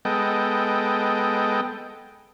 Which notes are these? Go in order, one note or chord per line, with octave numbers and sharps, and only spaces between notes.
G#3 B3 A4 D#5 G5